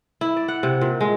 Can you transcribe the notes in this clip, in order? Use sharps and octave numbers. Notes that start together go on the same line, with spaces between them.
E4
D5
F#5
C3
A#2
G#3